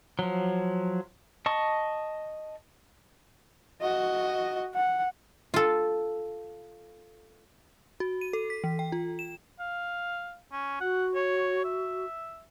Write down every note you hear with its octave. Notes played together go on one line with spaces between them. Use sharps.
F3 F#3
D#5 A5 C#6
F#4 D#5
F#5
F4 A4
F#4
D#7
A4
B6
E3
G5
F4
E7
F5
C#4
F#4 F#5
C#5
E5